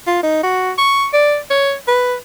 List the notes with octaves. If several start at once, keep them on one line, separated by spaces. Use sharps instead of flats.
F4
D#4
F#4
C#6
D5
C#5
B4